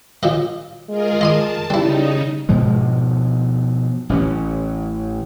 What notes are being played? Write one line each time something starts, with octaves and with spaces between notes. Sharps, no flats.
A#1 F3 D#5
G#3 F4 G#4 A#4
D#5 A5 C6 D#6
C#3 G3 C4 D#4 E4
G#2 B2 F3 G#3
A1 E3 A3 C#4